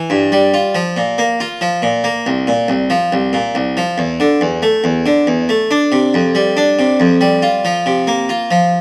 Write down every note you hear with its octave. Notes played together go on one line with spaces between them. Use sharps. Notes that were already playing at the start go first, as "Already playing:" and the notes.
Already playing: E3
G2
G3
F4
F3
A#2
A#3
F4
F3
A#2
A#3
C2
A#2
C2
F3
C2
A#2
C2
F3
E2
D3
E2
A3
E2
D3
E2
A3
D4
C3
F2
G3
D4
C3
F2
G3
F4
F3
C3
A#3
F4
F3